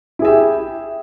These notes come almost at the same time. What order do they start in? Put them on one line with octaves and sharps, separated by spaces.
E4 G#4 E5 G4